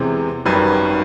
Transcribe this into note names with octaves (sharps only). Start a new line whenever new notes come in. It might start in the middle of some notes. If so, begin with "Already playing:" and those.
Already playing: E2 C3 E3 G#3 C5
G#1 F#2 D#3 G3 B4